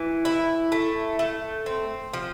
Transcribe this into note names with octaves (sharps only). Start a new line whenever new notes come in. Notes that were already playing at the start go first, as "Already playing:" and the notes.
Already playing: E3
E4
A3
A3
C4
F3